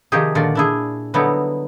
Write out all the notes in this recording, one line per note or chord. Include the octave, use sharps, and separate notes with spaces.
C3 D#3 F3 D#4 G4 G#4
A#2 D3 D#3 F4 F#4 D5
D4 E4 G#4
D3 F#3 G3 B3 D#4 E4